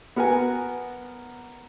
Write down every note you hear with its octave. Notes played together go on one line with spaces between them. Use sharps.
B3 F#4 A#4 F#5 G#5